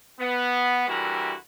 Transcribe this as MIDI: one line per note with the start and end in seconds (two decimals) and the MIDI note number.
0.20 0.87 59
0.88 1.34 50
0.88 1.34 52
0.88 1.34 55
0.88 1.34 64
0.88 1.34 66
0.88 1.34 70